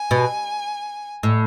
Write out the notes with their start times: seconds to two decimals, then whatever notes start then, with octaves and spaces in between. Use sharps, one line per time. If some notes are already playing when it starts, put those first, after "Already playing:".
Already playing: G#5
0.11 B2
1.23 A2